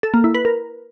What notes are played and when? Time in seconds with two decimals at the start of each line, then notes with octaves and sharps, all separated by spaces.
0.03 A4
0.14 A#3
0.24 E4
0.34 B4
0.45 A#4